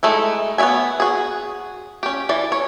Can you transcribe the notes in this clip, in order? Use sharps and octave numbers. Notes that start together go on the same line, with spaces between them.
G#3 A3 D#4 E4
B3 C#5 D5 E5 G#5
F#4 G#4
C#4 G4
E3 D5
C#5